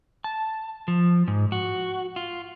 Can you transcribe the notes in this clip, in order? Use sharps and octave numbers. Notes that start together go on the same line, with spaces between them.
A5
F3
G#2
F#4
F4